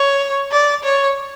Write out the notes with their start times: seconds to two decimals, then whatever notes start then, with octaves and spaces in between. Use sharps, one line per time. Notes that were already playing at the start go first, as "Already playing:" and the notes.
Already playing: C#5
0.52 D5
0.83 C#5